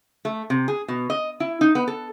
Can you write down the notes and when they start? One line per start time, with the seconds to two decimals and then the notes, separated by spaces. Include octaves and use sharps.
0.25 A3
0.50 C3
0.68 G#4
0.88 B2
1.10 D#5
1.40 E4
1.61 D#4
1.75 B3
1.88 A4